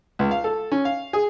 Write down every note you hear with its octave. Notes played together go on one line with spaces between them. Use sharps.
C#2
F5
A4
C#4
F5
G#4